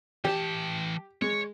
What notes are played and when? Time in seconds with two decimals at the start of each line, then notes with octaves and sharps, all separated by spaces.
0.25 E3 G4 A5
1.22 G#3 C#5